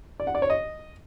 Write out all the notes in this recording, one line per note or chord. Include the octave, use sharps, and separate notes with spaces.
D5
F#5
D5
C#5
D#5